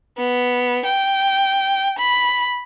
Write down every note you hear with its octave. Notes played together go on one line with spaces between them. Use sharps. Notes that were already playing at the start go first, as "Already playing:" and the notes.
B3
G5
B5